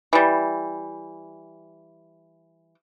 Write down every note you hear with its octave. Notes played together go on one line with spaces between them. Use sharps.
E3 G3